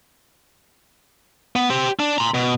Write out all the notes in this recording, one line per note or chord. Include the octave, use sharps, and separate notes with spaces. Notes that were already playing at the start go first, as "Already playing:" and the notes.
B3
G4 C5
D4
A#5 C6
B2